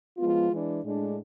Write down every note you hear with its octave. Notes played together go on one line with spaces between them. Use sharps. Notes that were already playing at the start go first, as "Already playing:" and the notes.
F3 G#3 B3 F4
E3 G#3 D4
A2 G#3 D4